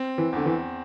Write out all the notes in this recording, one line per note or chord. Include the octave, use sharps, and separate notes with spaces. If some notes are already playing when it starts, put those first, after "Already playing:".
Already playing: C4
E3
E2 D3
E3